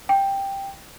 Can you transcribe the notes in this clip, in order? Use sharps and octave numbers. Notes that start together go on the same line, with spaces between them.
G5